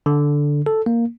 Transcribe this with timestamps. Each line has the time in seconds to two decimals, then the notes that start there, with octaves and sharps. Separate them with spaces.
0.06 D3
0.66 A4
0.86 A#3